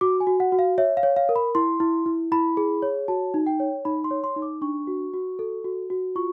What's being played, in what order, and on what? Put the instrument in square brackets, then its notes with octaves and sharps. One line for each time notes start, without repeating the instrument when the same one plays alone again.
[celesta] F#4 D6
G#5
F#4
F#5
F#4
F5
C#5 E5
F5
C#5
F5
A#4
B5
E4 C6
E4
E4
E4 B5
G#4
C#5
F#4 A5
D#4
G5
C#5
D#4 B5
C6
C#5
C6
D#4
D6
D4 C#6
F#4
F#4
A4
F#4
F#4
F4 C#6